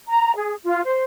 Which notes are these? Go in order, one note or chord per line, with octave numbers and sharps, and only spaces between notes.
A#5
G#4
F4
C5